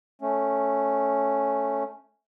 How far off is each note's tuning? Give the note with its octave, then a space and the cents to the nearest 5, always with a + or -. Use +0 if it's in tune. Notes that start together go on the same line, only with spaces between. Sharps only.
A3 -5 C#4 +0